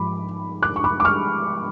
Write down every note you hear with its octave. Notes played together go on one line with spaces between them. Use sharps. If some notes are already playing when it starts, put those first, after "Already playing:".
Already playing: G#2 F3 B5 D6
D6 F#6
C#6
B5 D6
D6
C#6 F6